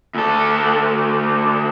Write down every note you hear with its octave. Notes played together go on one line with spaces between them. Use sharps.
D2 A4